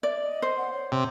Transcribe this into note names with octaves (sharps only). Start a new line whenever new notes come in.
D5 E5
D#5
C5
F#5
C#5
C3